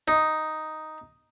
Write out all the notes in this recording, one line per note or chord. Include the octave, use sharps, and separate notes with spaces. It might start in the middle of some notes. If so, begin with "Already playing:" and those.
D#4